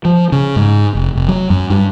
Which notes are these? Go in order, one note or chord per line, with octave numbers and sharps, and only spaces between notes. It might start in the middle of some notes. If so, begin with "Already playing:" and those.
F3
C#3
G#2
F1
F1
F#3
F#2
G2